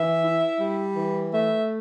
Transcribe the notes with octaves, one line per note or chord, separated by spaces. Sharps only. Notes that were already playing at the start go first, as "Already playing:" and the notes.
Already playing: E3 E5
E4
G3
E3
A3 E5